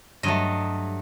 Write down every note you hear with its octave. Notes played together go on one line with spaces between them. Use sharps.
G2 F#3 A3 D#5